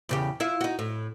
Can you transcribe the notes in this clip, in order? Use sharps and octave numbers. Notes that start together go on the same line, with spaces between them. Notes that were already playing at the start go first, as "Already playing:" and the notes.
E2 C#3 G4
E4 F4 E5
D#4 F#4
A2